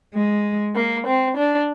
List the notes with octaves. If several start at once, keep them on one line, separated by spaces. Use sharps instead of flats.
G#3
A#3
C4
D4